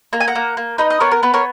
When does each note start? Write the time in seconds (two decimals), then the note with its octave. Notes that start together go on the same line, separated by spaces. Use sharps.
0.13 A#3 A#5
0.20 G#5
0.27 F#5 A#5
0.35 A#3
0.57 A#3
0.78 D#4 B4 D#5
0.90 D#5
1.00 B3 A#4 C#5
1.12 A#4
1.23 B3 B4
1.34 A#4 C#5